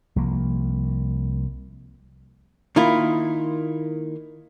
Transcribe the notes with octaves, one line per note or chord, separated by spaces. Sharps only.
C2 F3 A#3
D#3 A#3 E4 F4